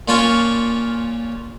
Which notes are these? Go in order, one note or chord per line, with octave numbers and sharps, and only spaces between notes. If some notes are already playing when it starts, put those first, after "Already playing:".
A#2 A#3 C#4 F4 A5 C#6